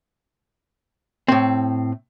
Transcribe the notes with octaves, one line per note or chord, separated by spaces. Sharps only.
A2 C4